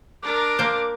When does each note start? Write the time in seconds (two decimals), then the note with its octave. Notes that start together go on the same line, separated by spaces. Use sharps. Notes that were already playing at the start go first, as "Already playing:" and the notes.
0.23 D4 A#4 D6
0.59 A#3 C5